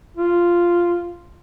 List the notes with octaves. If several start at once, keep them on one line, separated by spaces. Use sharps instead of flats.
F4